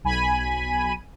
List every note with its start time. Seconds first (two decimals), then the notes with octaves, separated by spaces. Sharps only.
0.04 B1 G#5 B5 D#7